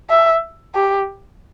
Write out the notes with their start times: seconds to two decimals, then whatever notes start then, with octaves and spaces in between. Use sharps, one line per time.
0.10 E5
0.75 G4